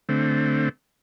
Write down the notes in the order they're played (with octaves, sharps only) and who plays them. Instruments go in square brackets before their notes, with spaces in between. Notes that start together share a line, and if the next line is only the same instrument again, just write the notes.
[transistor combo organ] D3 A3 C4